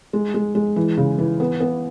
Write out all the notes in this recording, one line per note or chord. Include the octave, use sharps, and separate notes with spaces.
G#3
G#3
G#3
E3
C#3
E3
B3
B3